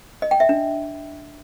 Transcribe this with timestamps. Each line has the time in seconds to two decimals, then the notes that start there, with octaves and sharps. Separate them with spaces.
0.22 D#5
0.31 G5
0.40 E5
0.49 D4